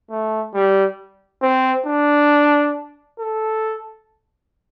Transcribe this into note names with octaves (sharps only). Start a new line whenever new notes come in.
A3
G3
C4
D4
A4